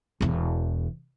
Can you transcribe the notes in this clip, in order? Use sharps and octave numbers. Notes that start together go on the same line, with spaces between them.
E1 E2